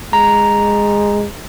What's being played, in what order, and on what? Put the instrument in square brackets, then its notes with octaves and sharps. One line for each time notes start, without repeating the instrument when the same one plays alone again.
[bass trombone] G#3 [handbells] A#5